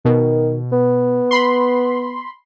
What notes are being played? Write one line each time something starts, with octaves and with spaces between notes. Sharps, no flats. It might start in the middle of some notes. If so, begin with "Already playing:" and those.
B2 D#3
B3
B5 C6